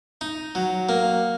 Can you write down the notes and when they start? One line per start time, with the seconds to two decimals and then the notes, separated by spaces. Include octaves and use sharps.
0.21 D#4
0.55 F#3
0.89 A#3